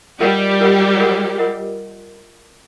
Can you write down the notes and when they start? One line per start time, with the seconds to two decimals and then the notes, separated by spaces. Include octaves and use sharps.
0.20 G3 F4 G4 A#4 D#5 F#5
0.60 F4 A#4 D#5 F#5
0.99 F4 A#4 D#5 F#5
1.38 F4 A#4 D#5 F#5